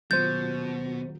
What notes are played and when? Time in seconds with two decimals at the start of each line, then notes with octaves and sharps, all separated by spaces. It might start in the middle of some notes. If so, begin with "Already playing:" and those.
0.11 D#1 B2 F#3 F4 C5 G6 A6